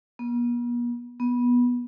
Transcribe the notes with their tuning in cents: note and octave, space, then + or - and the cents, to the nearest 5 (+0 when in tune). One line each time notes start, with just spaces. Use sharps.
B3 -45
B3 -20